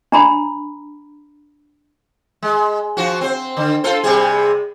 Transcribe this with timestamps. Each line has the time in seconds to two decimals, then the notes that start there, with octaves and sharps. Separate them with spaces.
0.12 D4 A#5 B5
2.43 G#3
2.97 F3 F#4
3.21 C4 C5
3.57 D3
3.84 F4 A4 C5
4.04 C3 G3 G#4